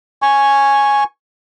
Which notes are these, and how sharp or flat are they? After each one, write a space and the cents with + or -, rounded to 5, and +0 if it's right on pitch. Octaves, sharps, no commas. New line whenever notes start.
G#5 +0 C#6 -5